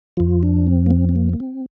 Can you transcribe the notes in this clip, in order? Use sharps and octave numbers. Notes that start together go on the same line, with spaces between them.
F2 F3 F4
D4
C4
A#3
C4
C4
A#3
A#3
C4